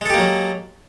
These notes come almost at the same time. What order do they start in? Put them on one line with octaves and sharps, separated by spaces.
G#3 A4 G4 A#3 F#3